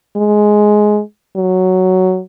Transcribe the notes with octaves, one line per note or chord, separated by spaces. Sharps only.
G#3
F#3